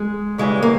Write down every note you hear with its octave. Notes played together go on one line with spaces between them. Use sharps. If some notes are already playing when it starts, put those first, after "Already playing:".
Already playing: G#3
C#3 E3 G3 G#3
A#3